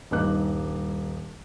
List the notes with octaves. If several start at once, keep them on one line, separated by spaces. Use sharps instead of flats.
D#1 G2 D#4 D6 F#6